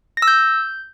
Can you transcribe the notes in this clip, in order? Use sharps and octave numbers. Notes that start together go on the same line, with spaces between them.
A#6
E6
G6